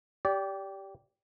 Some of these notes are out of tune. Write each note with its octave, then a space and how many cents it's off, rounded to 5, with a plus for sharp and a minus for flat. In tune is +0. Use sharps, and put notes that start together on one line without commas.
G4 -5 D5 -25